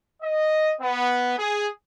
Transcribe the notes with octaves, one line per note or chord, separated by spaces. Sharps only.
D#5
B3
G#4